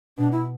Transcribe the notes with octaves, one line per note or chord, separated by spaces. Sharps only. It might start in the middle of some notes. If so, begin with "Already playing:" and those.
B2 D4
E4